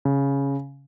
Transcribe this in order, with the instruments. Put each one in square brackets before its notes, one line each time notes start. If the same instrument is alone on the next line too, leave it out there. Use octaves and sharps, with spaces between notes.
[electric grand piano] C#3